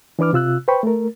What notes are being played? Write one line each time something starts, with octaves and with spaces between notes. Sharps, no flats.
E3 D4 B4 D6 F6
C3 F4 E6 F#6
B4 C5 G5 B5 C#6
A3 A#4